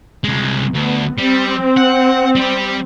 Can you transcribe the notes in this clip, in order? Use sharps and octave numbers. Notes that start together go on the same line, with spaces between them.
C2 G#3
D2 B3
G3 C4
F#5
G3 G4